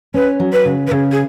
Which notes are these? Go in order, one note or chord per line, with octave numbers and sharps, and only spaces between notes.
C#4 B4
F#3
B4
C#3
B4
C#3 G#4
G#4